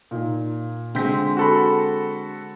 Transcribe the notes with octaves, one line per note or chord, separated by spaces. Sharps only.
A#2 D#4
D3 G#3 C4 G6 B6
F#4 A4 B5